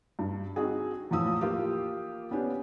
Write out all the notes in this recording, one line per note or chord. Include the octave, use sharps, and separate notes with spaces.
G2
C4 D#4 F#4 G#4
E2 A2 F3 D#6 E6
A#3 F4 G4
B3 C#4 D4 G4